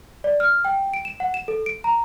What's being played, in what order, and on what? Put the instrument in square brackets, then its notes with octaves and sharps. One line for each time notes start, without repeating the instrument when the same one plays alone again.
[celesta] D5
F6
G5
D7
E7
F#5
E7
A4
D7
A#5